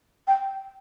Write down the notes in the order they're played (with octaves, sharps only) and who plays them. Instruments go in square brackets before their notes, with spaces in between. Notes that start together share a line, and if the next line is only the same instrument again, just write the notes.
[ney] G5